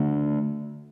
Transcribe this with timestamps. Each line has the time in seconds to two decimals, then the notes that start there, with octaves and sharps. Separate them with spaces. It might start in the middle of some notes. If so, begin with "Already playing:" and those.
Already playing: D3 A3 D4